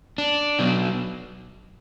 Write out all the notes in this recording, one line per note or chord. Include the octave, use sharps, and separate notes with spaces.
D4
B2 F#3 B3